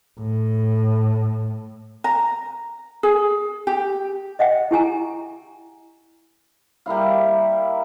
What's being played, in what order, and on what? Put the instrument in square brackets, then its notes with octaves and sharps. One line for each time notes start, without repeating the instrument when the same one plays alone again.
[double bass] A2
[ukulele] A#5
G#4
G4
[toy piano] D#5 E5 F#5 G5
E4 G4 G#5 A#5
[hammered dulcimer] G3 A#3 E4 F5